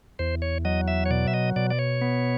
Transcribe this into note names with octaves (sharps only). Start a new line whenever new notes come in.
E2 C5
C#5
F#3 D#5
E5
C#5
B2 D5
E5
D#5
B2 D5
D5
C#5
B3